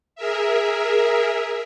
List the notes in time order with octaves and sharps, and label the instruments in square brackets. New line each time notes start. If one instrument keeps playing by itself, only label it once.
[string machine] G#4 A#4 E5